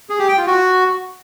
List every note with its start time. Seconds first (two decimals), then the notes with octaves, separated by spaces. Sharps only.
0.10 G#4
0.19 G4
0.28 G5
0.38 F4
0.47 F#4